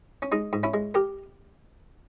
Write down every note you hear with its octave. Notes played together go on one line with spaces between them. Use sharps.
C#4
G#3 D#4
G#2
C#4 E4
G#3
G4 A#4